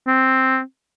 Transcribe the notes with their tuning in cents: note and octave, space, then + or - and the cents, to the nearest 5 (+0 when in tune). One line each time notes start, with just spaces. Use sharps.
C4 +5